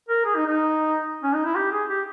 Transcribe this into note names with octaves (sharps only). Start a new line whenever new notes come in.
A#4
G#4
D#4
D#4
C#4
D#4
E4
G4
G#4
G4